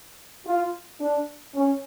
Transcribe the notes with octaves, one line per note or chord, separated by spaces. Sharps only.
F4
D4
C#4